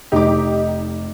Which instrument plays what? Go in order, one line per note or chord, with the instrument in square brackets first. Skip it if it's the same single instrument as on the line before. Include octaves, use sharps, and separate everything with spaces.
[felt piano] F1 D6 [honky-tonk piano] D#4 G4